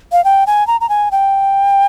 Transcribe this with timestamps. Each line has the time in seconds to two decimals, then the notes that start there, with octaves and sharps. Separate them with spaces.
0.12 F5
0.25 G5
0.47 G#5
0.67 A#5
0.81 A#5
0.89 G#5
1.12 G5